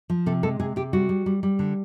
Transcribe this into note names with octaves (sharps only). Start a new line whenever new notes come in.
F3
C3 A4
G#3 A4
C3 G#4
C3 G4
G3 F#4
G3
G3
G3
D3